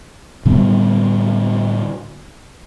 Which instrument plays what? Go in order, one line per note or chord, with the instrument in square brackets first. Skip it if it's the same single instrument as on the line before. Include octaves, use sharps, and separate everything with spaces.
[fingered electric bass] A2 D3 G3 B3